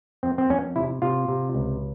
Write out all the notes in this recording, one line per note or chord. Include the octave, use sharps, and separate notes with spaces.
F2 C4
C4
F2 C#4
C3 E4
C3 F4
C3
C#2